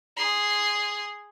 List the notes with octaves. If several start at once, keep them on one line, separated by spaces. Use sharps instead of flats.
G#4 C6